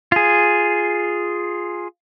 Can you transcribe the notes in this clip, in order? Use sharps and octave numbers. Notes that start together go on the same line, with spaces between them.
F4 G#4